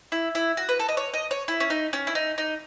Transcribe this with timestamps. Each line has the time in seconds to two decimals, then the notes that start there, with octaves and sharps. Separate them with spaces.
0.12 E4
0.35 E4
0.57 F#4
0.69 B4
0.79 A4
0.88 D#5
0.97 C#5
1.14 D#5
1.31 C#5
1.48 E4
1.60 C#4
1.70 D#4
1.93 C#4
2.07 E4
2.15 D#4
2.38 D#4